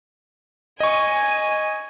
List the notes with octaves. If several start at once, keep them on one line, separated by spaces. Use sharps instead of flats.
D#5 G#5 C#6